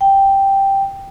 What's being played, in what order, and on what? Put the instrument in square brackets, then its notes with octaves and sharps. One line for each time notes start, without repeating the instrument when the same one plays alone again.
[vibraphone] G5